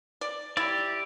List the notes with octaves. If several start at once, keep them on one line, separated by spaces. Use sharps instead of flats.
D5
E4 G4 D5